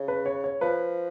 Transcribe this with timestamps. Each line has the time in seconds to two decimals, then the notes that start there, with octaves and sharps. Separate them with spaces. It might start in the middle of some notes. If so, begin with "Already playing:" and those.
Already playing: C#3
0.08 B4
0.26 C#5
0.44 C#5
0.61 F3 B4